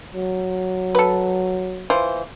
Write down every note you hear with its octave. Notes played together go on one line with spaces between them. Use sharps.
F#3
A4 B4
E3 F4 C5